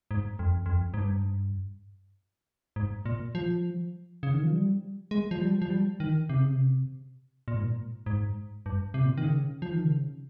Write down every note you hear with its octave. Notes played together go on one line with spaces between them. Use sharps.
G#2
F2
F2
G#2
G2
G#2
A#2
F3
C#3
D#3
F3
G3
G#3
F3
G3
F3
G3
D#3
C3
C#3
C3
A#2
G#2
A#2
G#2
G2
C3
A#2
D#3
C#3
F3
D#3
C#3